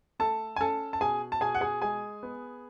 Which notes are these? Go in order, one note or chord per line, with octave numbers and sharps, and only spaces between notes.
A3 A4 A5
G#5
C#4 A4 A5
A5
B2 G#4 G#5
A5
B2 G#4 G#5
F#5
G#4 G#5
G#3 G#4 G#5
B3